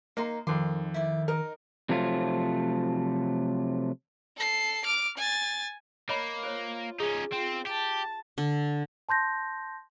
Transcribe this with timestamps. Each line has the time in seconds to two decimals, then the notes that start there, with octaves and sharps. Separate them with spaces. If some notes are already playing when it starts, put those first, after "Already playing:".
0.17 A#3 D#4 A#5 C6
0.47 F2 D#3 C6 D6
0.94 E4 D5
1.28 D#4 A#4 D#5
1.89 C3 F3 F#3 A3 F4
4.37 A4 C7
4.85 D6 F6
5.18 G#5 A6
6.09 A#3 C#5 D#5 B5
6.43 F4 C5 C#5
7.00 C#4 D#4 G#4
7.33 C4 F4
7.67 G4 A5
8.38 D3
9.09 A5 C6 G6 A#6